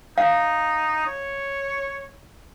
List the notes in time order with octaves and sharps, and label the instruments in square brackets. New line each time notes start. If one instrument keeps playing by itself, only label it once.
[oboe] D#4 [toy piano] F5
[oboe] C#5